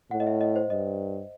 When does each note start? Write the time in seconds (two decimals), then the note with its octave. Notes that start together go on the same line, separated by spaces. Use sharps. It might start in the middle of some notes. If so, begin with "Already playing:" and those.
0.11 A2 F#5
0.20 D#5
0.27 E5
0.41 D#5
0.56 C5
0.70 G2 D#5